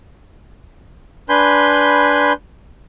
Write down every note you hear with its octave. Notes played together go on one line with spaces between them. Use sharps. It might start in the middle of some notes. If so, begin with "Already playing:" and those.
D4 B4 G#5 B5 C6 G6